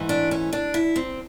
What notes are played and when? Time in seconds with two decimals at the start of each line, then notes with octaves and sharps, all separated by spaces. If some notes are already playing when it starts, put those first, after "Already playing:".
Already playing: G#2 E3 A3
0.09 D4
0.31 C#4
0.53 D4
0.74 E4
0.96 C4